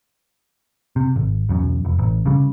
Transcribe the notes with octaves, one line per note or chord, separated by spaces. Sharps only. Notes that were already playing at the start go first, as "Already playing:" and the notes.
C3
G#1
E1 B1 F#2
F1
A1
C#3 G3